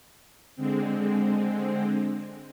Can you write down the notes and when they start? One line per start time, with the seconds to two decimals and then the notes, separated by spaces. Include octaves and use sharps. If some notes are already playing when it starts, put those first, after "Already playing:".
0.56 D3 G#3 C4